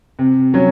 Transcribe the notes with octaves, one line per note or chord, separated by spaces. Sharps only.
C3
F#3 C#4